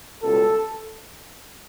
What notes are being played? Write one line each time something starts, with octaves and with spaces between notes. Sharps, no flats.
C#2 B2 G3 A4